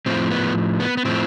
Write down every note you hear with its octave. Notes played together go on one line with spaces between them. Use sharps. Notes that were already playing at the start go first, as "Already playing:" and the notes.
A2 F3 C4
B3
B3
B3
A2 F3 C4